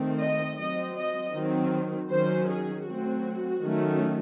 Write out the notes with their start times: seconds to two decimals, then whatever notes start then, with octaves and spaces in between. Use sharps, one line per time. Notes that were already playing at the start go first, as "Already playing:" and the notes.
Already playing: D#3 A3 C4
0.20 D#5
0.57 F#3 C4 D#5
0.96 D#5
1.34 D#3 F#3 C4
2.10 D#3 F#3 C#4 C5
2.49 G#4
2.87 F#3 A3 C4 F#4
3.63 D#3 F#3 A3 C#4